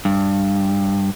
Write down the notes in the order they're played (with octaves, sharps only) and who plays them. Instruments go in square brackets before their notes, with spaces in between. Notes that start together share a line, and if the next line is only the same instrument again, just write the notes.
[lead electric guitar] G2